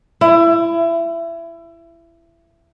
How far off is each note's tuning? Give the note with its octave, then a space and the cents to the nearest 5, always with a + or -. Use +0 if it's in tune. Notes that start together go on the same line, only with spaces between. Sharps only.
E4 +25